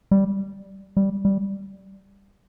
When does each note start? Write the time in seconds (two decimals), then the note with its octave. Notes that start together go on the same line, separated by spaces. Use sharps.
0.11 G3
0.97 G3
1.25 G3